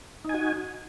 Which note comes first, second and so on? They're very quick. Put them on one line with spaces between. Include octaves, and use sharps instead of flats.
D#4 G#5 F#4